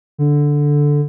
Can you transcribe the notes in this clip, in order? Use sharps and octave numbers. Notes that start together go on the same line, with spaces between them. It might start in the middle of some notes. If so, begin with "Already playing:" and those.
D3